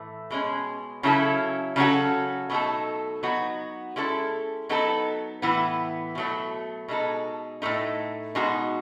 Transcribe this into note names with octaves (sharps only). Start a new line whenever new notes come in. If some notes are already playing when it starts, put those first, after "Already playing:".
Already playing: A2 E3 A3
B2 G#3 C#4
C#3 F#3 C#4 E4 A4
C#3 F#3 C#4 F#4 A4
B2 F#3 A3 D#4 A4
F#3 B3 D#4 F#4
G#3 C#4 E4 A4
F#3 B3 D#4 A4
A2 E3 B3
B2 F#3 A3
B2 G#3 D#4 A4
A2 E3 A3 D#4
B2 G#3 D#4 F#4